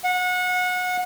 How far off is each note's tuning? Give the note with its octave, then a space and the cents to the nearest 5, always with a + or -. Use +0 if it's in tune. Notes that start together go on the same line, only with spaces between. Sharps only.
F#5 -25